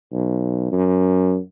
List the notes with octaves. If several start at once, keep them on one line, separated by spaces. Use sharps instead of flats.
B1
F#2